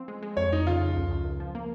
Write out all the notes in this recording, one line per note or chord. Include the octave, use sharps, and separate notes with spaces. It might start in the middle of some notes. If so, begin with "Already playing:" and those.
Already playing: F3 C4
G#3
G#3
F2 C#5
F2 D#4
C#3 F4
F2
C#2
C#2
C#2
F3
A#3